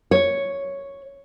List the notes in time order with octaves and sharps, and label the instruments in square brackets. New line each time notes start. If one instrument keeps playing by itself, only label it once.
[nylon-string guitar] C#5